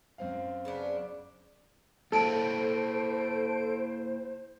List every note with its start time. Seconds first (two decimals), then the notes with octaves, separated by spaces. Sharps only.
0.18 F#2 C4 F5
0.65 C#3 B3 D4
2.12 A#3 E4 A4 C5 G5 D7